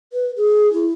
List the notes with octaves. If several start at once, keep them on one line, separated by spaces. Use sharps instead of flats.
B4
G#4
E4